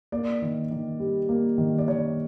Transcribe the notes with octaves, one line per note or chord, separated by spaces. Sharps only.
A#3 D5
D#3
D#3
G3
A#3
D#3
D5
D#3 C#5